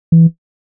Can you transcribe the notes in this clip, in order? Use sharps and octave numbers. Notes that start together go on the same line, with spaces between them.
E3